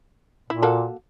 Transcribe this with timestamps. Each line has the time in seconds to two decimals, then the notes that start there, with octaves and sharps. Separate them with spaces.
0.50 A#2 E4
0.62 A#3 F#4 A4